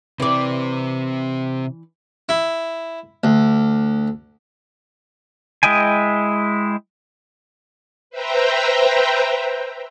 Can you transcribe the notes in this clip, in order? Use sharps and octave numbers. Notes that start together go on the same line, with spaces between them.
C3 E3 C4 D5
E4
D2
G#3 E4 D#5 G5 G#5
B4 C5 E5 G5 A#5